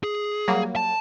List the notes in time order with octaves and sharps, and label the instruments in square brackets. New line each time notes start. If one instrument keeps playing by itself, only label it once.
[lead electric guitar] G#4
[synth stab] F#3 G3 A#3
[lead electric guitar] A5